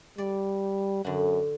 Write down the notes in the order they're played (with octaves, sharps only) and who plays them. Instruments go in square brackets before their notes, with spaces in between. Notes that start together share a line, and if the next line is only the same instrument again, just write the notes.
[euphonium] G3 [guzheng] D5
[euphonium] F#2 [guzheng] D3 F#4